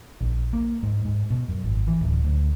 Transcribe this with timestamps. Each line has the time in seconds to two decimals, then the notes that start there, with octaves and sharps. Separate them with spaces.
0.21 A#1
0.53 A#3
0.83 G#2
1.05 G#2
1.30 B2
1.48 F#2
1.64 G#1
1.87 E3
2.01 D1
2.24 D2